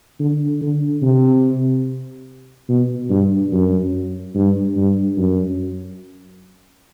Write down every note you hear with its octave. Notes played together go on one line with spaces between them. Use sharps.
D3
D3
C3
B2
G2
F#2
G2
G2
F#2